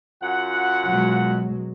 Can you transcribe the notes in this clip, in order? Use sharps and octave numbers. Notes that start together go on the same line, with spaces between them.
F#2 F4 F#5
B2 F#3 G#3